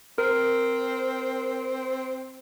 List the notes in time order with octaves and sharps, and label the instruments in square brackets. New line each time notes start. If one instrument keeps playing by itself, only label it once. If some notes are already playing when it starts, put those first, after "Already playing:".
[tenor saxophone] C4 [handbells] A#4